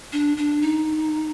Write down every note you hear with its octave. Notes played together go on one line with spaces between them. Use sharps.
D4
D4
D#4